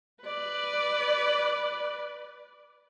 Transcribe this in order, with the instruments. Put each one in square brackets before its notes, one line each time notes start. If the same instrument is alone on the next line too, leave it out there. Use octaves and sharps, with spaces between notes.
[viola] B4 D5